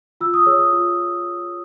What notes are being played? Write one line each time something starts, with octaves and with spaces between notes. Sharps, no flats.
F4 E6
D#6
G#4 C#5 E6
D#6
F4